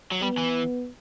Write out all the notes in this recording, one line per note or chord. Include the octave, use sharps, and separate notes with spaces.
F#3
G3 B3
E3